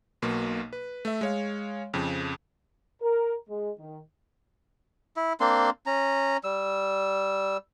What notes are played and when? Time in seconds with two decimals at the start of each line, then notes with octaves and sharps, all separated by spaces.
0.22 B1 B2 A#3
0.73 B4
1.05 A3 E5
1.21 G#3 C#5 F5
1.94 F2 C#3 F3
3.02 A#4
3.50 G#3
3.79 D#3
5.17 E4
5.40 A#3 C4 D4 C6
5.86 C#4 A#5
6.44 G3 E6